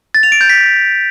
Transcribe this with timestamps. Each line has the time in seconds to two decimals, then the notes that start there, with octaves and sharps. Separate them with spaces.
0.15 A6
0.23 F7
0.32 D7
0.41 G6
0.49 B6